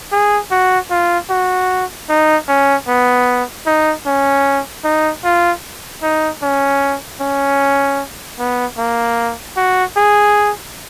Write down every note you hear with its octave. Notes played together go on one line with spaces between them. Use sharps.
G#4
F#4
F4
F#4
D#4
C#4
B3
D#4
C#4
D#4
F4
D#4
C#4
C#4
B3
A#3
F#4
G#4